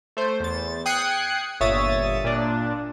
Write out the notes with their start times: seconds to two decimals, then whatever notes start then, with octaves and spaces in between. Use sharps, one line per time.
0.17 A3 C5
0.40 E2 A6
0.86 G5 D#6 F#6 G#6 C7 C#7
1.60 G1 A#2 C#5 E5 D#6 A6
2.24 A#2 D4